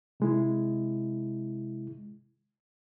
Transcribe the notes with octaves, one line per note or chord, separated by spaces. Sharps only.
C3 G#3 E4